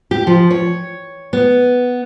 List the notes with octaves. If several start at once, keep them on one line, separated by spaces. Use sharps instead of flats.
G4
F3
C#5
B3